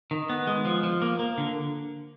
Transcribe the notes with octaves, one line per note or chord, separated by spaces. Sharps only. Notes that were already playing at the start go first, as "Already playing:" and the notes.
D#3
B3
G#3
F3
F3
A#3
A#3
D3